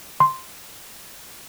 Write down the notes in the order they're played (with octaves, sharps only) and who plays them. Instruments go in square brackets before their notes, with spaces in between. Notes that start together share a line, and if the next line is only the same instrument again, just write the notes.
[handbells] C6